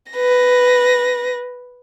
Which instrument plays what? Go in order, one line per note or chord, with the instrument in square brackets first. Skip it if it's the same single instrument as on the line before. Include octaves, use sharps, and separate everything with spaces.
[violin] B4 A#6